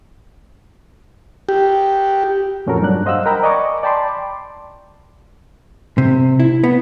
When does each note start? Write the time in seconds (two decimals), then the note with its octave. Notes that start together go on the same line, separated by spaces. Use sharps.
1.49 G4
2.66 F2 A#2 C#4 F#4 A4 A#4
2.81 G2 F#3 D4 F#6
3.06 C5 D#5 F5 F#5 E6 F#6
3.26 A#4 D#5 G5 A#5 B5
3.43 D5 D#5 G#5 A#5 C#6 D6
3.83 D5 G5 A5 B5 C6 D6
5.98 C3
6.40 E4
6.64 B3